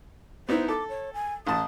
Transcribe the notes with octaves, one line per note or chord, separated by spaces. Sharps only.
B3 D#4 E4 C5
A4 D6
C#5
G#5
A1 A5 D#6